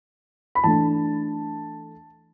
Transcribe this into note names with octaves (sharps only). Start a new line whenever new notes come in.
B5
E3 A3 D4 A5